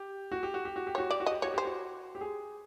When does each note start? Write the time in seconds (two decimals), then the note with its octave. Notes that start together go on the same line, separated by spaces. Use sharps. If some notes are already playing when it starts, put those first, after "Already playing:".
Already playing: G4
0.32 F#4
0.43 G4
0.54 F#4
0.65 G4
0.76 F#4
0.87 G4
0.95 F#4 C#5
1.10 G4 D5
1.20 F#4
1.26 D#5
1.32 G4
1.42 F#4 C#5
1.54 G4 C5
1.65 F#4
2.15 G4
2.21 G#4